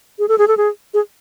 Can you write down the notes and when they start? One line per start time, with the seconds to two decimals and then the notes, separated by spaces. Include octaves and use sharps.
0.19 G#4
0.28 A4
0.38 G#4
0.48 A4
0.57 G#4
0.94 G#4